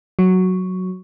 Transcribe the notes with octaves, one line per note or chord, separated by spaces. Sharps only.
F#3